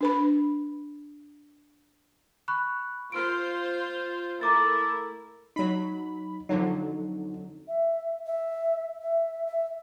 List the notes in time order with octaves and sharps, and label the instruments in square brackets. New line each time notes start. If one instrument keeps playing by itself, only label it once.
[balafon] D4 B4 B5
[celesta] B5 C#6 F#6
[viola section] F4 C5 [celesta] F6 D7
[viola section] A3 E4 A#4 [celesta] A#5 D6 A6
[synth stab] F#3 B5 [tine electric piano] D#4
[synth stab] F2 D3 F#3 [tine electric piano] D#4
[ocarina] E5
E5
E5
E5